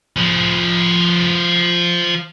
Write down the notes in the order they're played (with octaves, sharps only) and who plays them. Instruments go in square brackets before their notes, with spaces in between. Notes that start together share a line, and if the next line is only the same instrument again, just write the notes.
[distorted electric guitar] F3 G#4